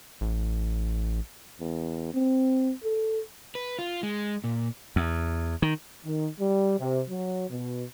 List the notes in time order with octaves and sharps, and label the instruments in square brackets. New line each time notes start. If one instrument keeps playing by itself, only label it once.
[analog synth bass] A1
[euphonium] E2
C4
A4
[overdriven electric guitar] B4
F4
G#3
A#2
[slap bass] E2
D#3
[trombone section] D#3
G3
C3
F#3
B2